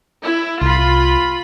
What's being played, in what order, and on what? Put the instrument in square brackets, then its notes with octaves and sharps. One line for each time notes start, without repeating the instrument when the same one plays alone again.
[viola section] E4
[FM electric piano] C2 [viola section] F4 B5